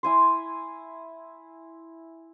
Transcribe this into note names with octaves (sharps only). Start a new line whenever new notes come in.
E4 G#5 C6